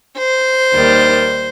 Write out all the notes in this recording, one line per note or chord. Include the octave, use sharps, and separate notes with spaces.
C5
D#2 D#3 G3